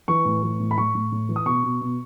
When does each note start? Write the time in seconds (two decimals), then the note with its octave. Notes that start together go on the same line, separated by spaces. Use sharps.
0.08 E3 C#6
0.25 A2
0.43 E3
0.60 A2
0.71 B5
0.77 A2 C#6
0.95 A2
1.12 A2
1.29 E3
1.36 D#6
1.46 B2 C#6
1.64 B2
1.81 B2